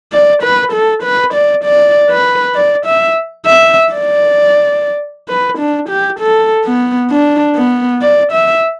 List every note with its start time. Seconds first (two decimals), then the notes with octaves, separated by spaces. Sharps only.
0.13 D5
0.43 B4
0.72 A4
1.03 B4
1.34 D5
1.64 D5
2.10 B4
2.55 D5
2.86 E5
3.46 E5
3.92 D5
5.28 B4
5.58 D4
5.89 G4
6.20 A4
6.65 B3
7.11 D4
7.56 B3
8.02 D5
8.32 E5